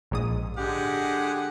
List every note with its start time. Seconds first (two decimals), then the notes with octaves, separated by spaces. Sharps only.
0.11 A#1 G#2 D#6
0.57 D3 G#3 G4 F#5